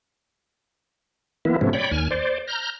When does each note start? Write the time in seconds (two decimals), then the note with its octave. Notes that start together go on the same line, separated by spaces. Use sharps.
1.45 E3 A#3 B3 E4
1.61 G#2 C3 F3 A3 B3 C#4
1.73 C#5 D5 G5 B5
1.91 D#2 G#5 F6
2.11 C5 D5
2.48 A#5 F6 G6